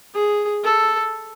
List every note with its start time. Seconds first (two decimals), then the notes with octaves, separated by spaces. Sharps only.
0.14 G#4
0.64 A4